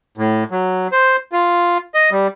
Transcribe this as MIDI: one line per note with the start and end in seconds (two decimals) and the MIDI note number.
0.17 0.44 45
0.51 0.88 54
0.92 1.16 72
1.32 1.78 65
1.94 2.10 75
2.11 2.27 55